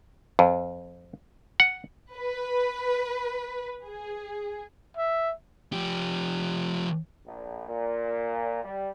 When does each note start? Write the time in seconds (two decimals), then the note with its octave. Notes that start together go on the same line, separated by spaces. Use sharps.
0.39 F2
1.60 F#5
2.14 B4
3.88 G#4
4.97 E5
5.73 F3 G4
7.25 A#1
7.68 A#2
8.63 G3